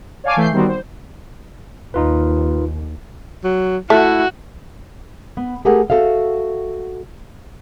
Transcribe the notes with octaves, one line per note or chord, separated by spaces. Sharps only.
C#5 D5 F5 G#5 A5 D6
E3 A3 G6 C7
D#3 G3 B3 C4 F#4
C5
D#2 D#4 F4 B4
F#3
A3 E4 F#4
B3
A3 G4 G#4 A#4 F#5
F#4 G4 A4 E5 F5